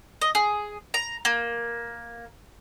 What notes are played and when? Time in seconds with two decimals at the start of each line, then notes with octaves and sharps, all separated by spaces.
0.22 D#5
0.35 G#4
0.94 A#5
1.25 A#3